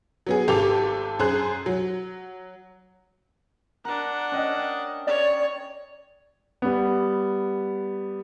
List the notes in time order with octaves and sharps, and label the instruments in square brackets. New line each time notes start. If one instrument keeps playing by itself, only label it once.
[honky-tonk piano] F#3 B3 G#4
G#1 G4 A4 D6 F7
F#2 G#4 C5 F#6
F#3
[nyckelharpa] D4 F#5 [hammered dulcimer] A#4
[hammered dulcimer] C#4 D#5 G5
[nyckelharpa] C#5 [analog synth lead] D5
[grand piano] G3 B3